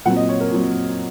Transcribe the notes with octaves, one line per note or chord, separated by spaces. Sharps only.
A#2 F#3 C4 F#5
D#5
C#5
A#4
A#2 F#3 C4